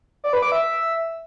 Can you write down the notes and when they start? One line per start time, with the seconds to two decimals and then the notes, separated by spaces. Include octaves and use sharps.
0.24 D5
0.33 B4
0.42 D6
0.52 E5